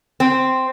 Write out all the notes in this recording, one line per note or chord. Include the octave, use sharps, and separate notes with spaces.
C4